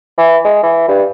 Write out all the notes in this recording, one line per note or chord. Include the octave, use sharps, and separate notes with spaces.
E3
G#3
E3
G2